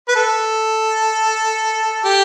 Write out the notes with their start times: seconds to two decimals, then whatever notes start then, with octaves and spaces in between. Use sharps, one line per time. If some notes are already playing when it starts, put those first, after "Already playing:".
0.08 B4
0.16 A4
2.05 G4